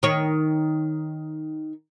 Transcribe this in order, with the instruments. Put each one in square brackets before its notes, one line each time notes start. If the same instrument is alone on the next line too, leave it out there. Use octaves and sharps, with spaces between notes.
[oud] D#3 C#5